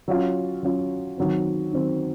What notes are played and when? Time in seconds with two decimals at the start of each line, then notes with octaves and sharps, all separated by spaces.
0.08 F#3 C#4 F4
0.63 F#3 C#4 F4
1.18 D#3 F#3 C4
1.73 D#3 F#3 C4